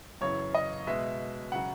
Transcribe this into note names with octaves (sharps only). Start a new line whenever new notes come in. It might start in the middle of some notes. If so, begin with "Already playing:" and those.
F#2 C#3 E3 C#5
D#5
B2 G#3 E5
C#3 F#3 F#5